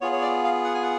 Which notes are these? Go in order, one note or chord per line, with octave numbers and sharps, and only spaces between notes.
B3 F4 G#4 C#5
C#5
D5
F5
F#5
G#5
F#5